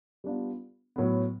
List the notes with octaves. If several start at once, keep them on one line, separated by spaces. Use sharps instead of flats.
G3 B3 D4 F4
A2 F#3 B3